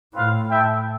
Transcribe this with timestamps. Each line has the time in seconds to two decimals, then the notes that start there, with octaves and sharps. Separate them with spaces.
0.14 A2 C4 F4 B4 F5
0.50 E4 A4 E5 G5